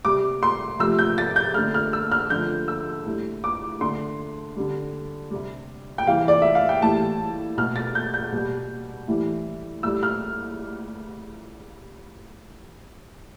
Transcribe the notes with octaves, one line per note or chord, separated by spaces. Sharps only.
C3 G3 D6
C6
C3 F3 A3 E6
G6
A6
G6
D3 A3 F6
F6
E6
F6
D3 F3 A3 G6
E6
A2 G3
D6
D3 A3 C6
D3 G3
C3 G3
G5
C3 E3 G3 F5
D5
E5
F5
G5
A2 E3 G3 A5
B2 A3 F6
A6
G6
G6
B2 G3
A2 E3 G3
A2 G3 E6
F6